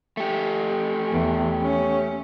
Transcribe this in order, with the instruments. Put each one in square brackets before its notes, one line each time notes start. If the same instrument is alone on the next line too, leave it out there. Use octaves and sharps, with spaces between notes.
[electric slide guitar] A3 G4
[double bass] E2
C#4